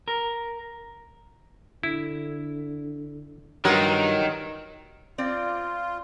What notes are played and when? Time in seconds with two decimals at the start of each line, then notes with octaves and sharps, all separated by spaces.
0.08 A#4
1.83 D3 E4
3.65 G2 D#3 F#3 G#3 F4 A#4
5.18 C4 F4 D5